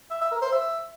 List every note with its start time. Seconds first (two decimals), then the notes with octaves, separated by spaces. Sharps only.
0.11 E5
0.21 E5
0.32 A#4
0.42 C5
0.52 E5